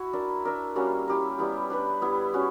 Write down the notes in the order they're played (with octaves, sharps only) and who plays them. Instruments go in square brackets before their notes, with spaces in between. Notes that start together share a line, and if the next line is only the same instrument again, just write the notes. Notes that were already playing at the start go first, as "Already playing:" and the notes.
Already playing: [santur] E4 F#4
D4 A#4 E5
D4 A#4 E5
G3 A#3 C#4 F#4
E4 G4 A#4
G3 B3 E4
D4 G4 B4
B3 E4 G4
C#4 F#4